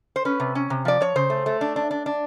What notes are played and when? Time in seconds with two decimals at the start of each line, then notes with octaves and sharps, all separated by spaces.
0.16 C5
0.25 C#4 B4
0.40 C3
0.55 C#4
0.70 C3
0.85 F3 D5
1.01 F3 C#5
1.16 C#3 C5
1.30 A3
1.46 A3
1.61 D4
1.76 D4
1.91 D4
2.06 D4